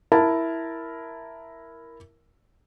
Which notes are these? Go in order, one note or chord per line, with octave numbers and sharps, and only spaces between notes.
E4 A#4 A5